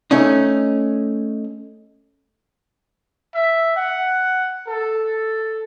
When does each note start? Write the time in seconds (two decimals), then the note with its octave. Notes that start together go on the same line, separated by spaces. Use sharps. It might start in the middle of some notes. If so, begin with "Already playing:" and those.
0.11 A3 C#4 D#4
3.34 E5
3.76 F#5
4.67 A4